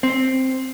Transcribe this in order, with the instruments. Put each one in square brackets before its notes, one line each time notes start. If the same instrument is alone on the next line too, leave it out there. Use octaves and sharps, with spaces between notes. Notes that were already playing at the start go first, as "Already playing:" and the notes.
[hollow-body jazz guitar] C4